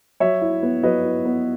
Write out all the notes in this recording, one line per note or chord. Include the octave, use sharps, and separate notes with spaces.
F#3 C#5 E5
E4
B3
F#3 B4 D#5
E4
B3